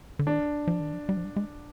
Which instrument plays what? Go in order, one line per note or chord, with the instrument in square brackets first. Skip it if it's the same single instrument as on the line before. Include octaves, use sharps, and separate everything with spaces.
[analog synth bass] D3
[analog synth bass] D#3 [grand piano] D4
[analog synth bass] F3
D#3
F3
G3
F3
G3
G#3